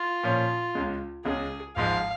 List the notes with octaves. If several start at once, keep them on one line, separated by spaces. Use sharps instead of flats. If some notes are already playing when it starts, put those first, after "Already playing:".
Already playing: F4
A#2 F3 C#4
C#2 C#3 G#3
C#2 C#3 G#3 G#4
G#1 G#2 F3 G#3 F5